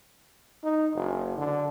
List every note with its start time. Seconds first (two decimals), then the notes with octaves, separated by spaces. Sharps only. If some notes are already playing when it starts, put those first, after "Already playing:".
0.63 D#4
0.95 F#1
1.38 D3